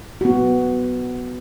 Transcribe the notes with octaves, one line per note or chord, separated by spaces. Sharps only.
B3 F#4